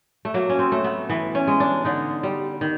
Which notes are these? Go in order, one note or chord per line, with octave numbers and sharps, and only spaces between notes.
A3
F#3 A#3
C#4
C4
A3
B3
E3 B3
C#4
G#3
D4
D3 D#4
G3
D#3